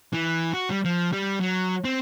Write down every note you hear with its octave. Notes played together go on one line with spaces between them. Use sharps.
E3
F#4
G3
F3
G3
F#3
C4